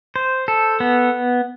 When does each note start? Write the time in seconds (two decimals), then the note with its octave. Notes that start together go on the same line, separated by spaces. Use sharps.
0.16 C5
0.48 A4
0.80 B3